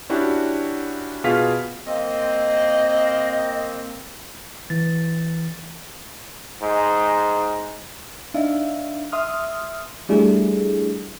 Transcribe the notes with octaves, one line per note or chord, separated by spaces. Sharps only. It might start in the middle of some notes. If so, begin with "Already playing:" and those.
C#4 D4 E4 F#4 G4
B2 F4 G#4 F5 F6 B6
A#3 C4 D#5
E3 A6
G#2
D4 D#4 E5 F5
E5 C6 D#6 F6
F3 G3 A3 D4 E4 G#4